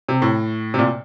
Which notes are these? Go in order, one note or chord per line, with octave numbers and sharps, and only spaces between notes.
C3
A2
C3
A#2